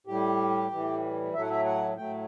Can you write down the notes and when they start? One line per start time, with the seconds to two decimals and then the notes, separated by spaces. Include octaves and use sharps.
0.07 A2 G3 G4
0.71 A2 E3 G3
1.34 A2 F#3 A3 E5
1.41 F#5
1.50 E5
1.66 F#5
1.97 A2 F#3 A3 G5